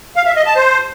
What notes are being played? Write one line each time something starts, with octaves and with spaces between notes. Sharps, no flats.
F5
E5
D#5
A5
C5